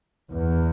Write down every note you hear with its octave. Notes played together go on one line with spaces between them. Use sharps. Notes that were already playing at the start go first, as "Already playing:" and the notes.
E2